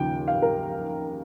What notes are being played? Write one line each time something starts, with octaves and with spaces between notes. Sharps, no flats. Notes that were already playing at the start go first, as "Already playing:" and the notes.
Already playing: D#2 C#3 F3 G5
F5
A#4